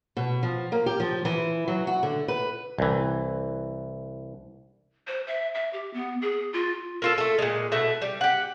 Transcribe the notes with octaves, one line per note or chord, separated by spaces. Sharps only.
B2
F3
A#3
G4
F3
E3
F#3
F#4
D3
B4
C2 E3
C5
E5
E5
G4
B3
G#4
F4
A#3 F4 A4
A3 A4
A#2 G#3
B2 A3 E4
G3
G4 F#5